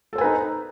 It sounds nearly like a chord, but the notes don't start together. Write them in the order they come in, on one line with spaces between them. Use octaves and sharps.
A4 C5 G#5 B4 D#4